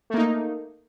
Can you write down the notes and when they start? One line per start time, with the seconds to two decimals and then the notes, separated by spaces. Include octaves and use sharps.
0.10 A3
0.14 A#3
0.18 D#4